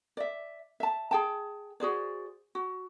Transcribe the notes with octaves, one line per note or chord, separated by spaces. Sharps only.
D5 E5
E5 A5
G#4 G5 A5
F#4 G#4 C5 D5
F#4